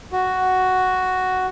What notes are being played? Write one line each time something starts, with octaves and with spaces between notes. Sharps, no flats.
F#4